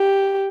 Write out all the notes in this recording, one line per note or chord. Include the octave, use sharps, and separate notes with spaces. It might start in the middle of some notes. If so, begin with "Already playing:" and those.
Already playing: G4